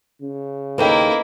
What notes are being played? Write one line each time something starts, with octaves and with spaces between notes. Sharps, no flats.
C#3
D#2 A#3 E4 A4 B4 D#5 G5